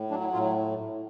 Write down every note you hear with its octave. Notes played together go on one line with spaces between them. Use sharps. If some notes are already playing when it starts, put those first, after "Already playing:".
Already playing: A2
F#3 D4
E4
A2 F4